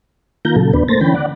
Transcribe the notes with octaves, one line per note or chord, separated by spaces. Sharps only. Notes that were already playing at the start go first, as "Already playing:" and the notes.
D#3 A#3 F4 A#5 G6
A#2 C#3 F#3 A4
D#2 B3 D4 B4
A3 A#3 C5 A6 A#6
D3 E3 C#4 G5 B5
D5 F#5